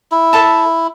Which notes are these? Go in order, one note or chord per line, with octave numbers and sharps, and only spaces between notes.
E4
A4 E5 A5